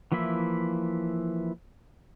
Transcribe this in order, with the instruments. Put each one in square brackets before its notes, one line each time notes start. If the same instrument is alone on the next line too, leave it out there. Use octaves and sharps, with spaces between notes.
[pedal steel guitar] E3 F3 A#3 E4 E5